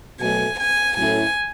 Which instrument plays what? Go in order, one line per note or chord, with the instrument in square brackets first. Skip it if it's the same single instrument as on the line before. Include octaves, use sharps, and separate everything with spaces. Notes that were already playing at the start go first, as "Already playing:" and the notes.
[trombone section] B2 F#3 A3 [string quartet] G#5
[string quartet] G#5
[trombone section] A2 F#3 C#4 E4 A4 [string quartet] G#5